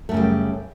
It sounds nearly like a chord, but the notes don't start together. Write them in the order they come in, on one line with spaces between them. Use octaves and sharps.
A3 F#2 C#3 G3